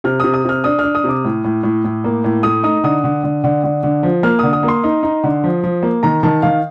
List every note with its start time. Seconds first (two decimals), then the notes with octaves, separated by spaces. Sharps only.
0.04 C3 F6
0.20 C3 D#6
0.34 D#6
0.45 C3 F6
0.64 D4 D#6
0.79 D4 F6
0.95 D#6
1.04 C3 D6
1.24 A2
1.44 A2
1.63 A2
1.84 A2
2.04 A#3
2.24 A2
2.43 A3 D#6
2.63 D#4 D#6
2.84 D3 D#6
3.04 D3
3.24 D3
3.44 D3
3.64 D3
3.83 D3
4.03 F3
4.23 A#3 F6
4.39 D3 D#6
4.53 D#6
4.63 A#3
4.68 C6
4.83 D#4
5.03 D#4
5.23 D3
5.44 F3
5.63 F3
5.83 A#3
6.03 D#3 A#5
6.23 D#3 A5
6.42 D#3 F5